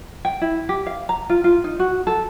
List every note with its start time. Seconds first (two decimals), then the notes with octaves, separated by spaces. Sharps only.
0.25 G5
0.41 E4
0.69 G4
0.86 F5
1.09 A#5
1.30 F4
1.44 F4
1.64 D#4
1.79 F#4
2.07 A4